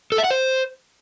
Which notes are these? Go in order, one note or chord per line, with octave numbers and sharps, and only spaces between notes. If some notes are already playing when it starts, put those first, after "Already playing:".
A4
E5
F#5
C5